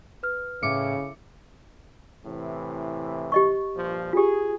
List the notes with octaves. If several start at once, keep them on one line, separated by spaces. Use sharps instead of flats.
B4 F6
A2 C#3 D6 C#7
A2 C3 E3
G4 D#5 C#6
G2 A#2 F3
F4 G4 G#4